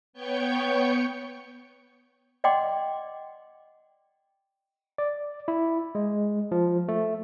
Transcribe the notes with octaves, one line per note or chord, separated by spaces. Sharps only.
B3 C#5 G5 C#6 G6 C#7
D5 D#5 F#5 G5 C6 D6
D5
E4
G#3
F3
A3